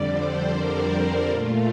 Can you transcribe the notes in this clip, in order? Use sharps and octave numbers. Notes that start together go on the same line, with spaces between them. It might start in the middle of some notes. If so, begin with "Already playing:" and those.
Already playing: F2 D3 G3 D5
C5
A#4
A#4
A#2 A3 F4